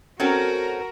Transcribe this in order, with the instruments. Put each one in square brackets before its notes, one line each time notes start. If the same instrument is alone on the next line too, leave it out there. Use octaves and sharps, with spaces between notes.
[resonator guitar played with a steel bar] C4 C#4 A4 [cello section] F#4 A#4